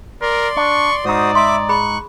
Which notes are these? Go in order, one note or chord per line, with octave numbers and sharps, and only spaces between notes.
A#4 D5 C6
D4 C#6
G#2 D#4 F#4 C5 D5 D#6
E5 B5 C6 D6
G#4 B5 C#6 F#6